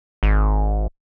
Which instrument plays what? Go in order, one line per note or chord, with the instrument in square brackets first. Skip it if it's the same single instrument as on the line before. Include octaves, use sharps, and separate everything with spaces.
[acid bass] G#1